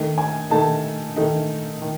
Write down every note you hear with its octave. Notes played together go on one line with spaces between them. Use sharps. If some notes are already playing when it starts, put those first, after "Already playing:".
Already playing: D#3 A3 D#4
G#5
D#3 A3 D#4 A5
D#3 A3 D#4
D#3